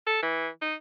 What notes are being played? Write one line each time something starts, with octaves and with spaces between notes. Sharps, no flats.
A4
E3
D#4